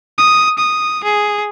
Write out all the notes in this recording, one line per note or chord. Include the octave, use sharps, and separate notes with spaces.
D#6
D#6
G#4